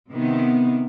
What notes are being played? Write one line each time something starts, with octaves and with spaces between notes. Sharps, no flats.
C3 D#3 B3